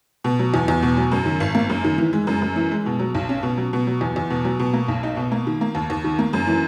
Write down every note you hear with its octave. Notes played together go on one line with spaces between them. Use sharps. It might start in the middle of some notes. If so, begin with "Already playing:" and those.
B2
F#3
E2
E2
B2
F#3
F#2
D#3
G#1
A#3
F#2
D#3
E3
G#3
F#2
F#2
E3
G#3
B2
F#3
B1
C#4
B2
F#3
B2
F#3
E2
E2
B2
F#3
B2
A#3
B1
D#4
B2
A#3
D#3
A#3
D#2
D#2
D#3
A#3
F#2
E3